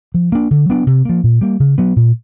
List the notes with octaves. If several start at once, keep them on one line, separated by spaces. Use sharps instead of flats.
F3
A#3 D4
D3
F#3 B3 D4
C3
F3 A#3
A#2
G3 A#3
C#3
F#3 B3
A#2